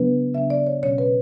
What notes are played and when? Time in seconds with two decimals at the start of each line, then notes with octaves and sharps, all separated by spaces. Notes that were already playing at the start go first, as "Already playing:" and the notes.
Already playing: C#3 F#3 B3 D4 B4
0.35 C#3 F#3 B3 D4 E5
0.50 D5
0.67 C#5
0.83 B2 F#3 C#4 C#5
0.98 B4